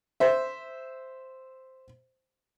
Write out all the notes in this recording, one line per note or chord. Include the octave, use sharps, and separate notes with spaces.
C5 E5